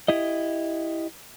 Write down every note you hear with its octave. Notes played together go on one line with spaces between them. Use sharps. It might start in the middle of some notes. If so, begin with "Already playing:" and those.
E4 G4 D#5